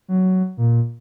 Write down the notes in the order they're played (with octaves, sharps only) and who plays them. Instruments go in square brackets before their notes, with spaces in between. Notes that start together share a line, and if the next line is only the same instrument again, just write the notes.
[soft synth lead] F#3
A#2